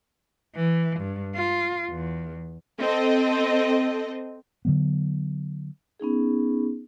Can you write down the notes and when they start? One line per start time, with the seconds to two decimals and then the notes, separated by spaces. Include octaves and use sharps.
0.55 E3
1.00 G2
1.35 F4
1.90 E2
2.80 C4 A4 D#5
4.65 D3 F#3 B3
6.00 B3 C#4 D#4 G#4